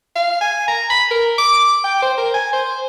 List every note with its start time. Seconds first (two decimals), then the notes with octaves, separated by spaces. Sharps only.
0.15 F5
0.41 G#5
0.68 A#5
0.90 B5
1.11 A#4
1.38 D6
1.84 G5
2.02 C5
2.17 A#4
2.34 G#5
2.53 C5